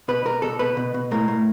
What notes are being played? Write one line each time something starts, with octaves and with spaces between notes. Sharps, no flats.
B2 B4
B2 A#4
B2 A4
B2 B4
B2
B2
A2 A#4
A2